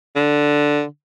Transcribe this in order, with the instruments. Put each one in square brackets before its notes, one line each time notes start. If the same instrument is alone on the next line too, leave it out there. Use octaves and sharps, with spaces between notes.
[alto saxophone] D3